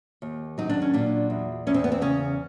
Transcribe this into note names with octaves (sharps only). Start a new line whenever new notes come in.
D#2
F#3 D#4
D4
C#4
A#2 D4
E2
E2 C#4
C4
B3
C4
C#3 C#4